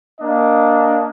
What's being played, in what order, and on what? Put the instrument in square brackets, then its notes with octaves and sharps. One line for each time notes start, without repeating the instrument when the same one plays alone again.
[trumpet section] A#3 D4 D#5